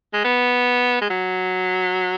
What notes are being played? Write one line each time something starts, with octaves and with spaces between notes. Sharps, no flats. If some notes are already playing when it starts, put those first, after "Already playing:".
G#3
B3
G#3
F#3